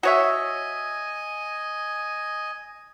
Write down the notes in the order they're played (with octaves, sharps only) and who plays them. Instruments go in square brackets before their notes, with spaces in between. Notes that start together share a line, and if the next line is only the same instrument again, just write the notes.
[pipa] F#4 C#5 E5 [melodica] D#5 G#5